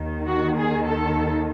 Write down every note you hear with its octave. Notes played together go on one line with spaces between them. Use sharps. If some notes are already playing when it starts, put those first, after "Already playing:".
Already playing: D#2 D#3
F#4
G#4
A4